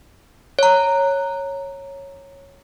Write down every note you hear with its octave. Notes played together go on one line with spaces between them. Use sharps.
C#5 A#5